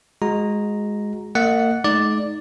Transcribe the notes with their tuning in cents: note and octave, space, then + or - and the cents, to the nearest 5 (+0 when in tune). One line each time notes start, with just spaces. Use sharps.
G#3 +0 F#4 -25 A#5 +0
A#3 -35 D#5 +5 F#5 +0
G#3 +45 D#4 +0 D5 +0